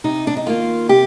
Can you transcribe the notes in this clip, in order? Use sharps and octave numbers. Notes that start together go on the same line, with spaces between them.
C3 D#4
D4
D#4
D#3 A#3 F4
C3 G4